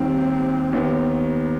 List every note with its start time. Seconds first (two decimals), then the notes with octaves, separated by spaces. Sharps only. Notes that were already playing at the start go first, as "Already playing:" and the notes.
Already playing: D#2 D#3 G3 C4
0.73 D#2 D#3 B3